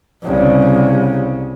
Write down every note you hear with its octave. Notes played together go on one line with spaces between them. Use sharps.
C2 C#3